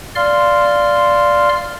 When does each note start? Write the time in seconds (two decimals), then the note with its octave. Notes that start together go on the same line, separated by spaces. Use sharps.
0.16 D5 F5 C6 F6